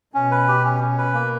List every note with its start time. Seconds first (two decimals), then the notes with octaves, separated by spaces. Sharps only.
0.14 B2 C#4
0.31 B4
0.48 G4
0.65 C#4
0.81 C#4
0.98 B4
1.14 A#3